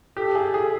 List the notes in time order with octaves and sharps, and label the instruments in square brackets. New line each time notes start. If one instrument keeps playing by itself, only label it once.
[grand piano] G4 [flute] A4
[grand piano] G#4
G#4